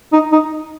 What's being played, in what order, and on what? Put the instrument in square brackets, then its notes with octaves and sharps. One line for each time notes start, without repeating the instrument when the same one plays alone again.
[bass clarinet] D#4
D#4